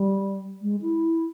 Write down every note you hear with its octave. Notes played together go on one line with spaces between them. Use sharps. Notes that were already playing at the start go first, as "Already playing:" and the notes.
Already playing: G3
G#3
E4